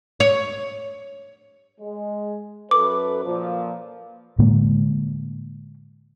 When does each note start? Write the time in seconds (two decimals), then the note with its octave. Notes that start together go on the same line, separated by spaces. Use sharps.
0.20 C#5
1.81 G#3
2.71 F#2 A4 B4 D6
3.25 A#2 F3
4.39 A2 D3 G#3 A#3